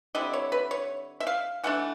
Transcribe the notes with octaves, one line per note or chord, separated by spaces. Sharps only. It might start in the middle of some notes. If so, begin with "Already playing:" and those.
D3 G3 C4 E4 D#5
C#5
B4
C#5
E5
F5
E3 A3 D4 F#5